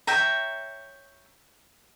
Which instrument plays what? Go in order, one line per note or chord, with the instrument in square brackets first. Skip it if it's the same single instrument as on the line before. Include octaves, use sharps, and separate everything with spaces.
[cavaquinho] C#5 E5 G5 A#5